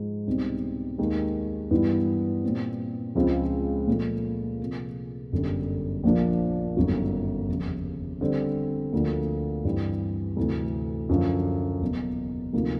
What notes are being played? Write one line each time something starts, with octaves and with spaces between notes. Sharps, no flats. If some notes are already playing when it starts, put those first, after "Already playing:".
Already playing: G#2 F3 G#3
C2 B2 G3 C4 D#4
D#2 D#3 G#3
G2 E3 G3 B3 E4
A#2 G3 C4
C#2 C#3 F3 G#3 C4
A#2 F3 A3
C3 F3 A#3
G1 F#2 D3 G3
A#1 A#2 F3 A#3 D4
G1 F#2 D#3 F#3 A#3
F1 D#2 C#3
D3 G3 C4
D2 D3 F3 A#3
G2 E3 G3 C4 E4
D2 C3 E3 A3
F#2 D3 F3
F#1 E2 B2
D2 C3 F3 A#3 D#4